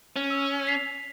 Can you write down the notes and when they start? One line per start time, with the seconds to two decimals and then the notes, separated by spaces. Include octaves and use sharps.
0.16 C#4
0.30 E6
0.67 B6 C7 F7